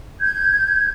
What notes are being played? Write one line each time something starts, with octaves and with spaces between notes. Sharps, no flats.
G6 G#6